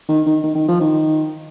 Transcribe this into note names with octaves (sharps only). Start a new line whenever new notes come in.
D#3
D#3
D#3
D#3
F3
D#3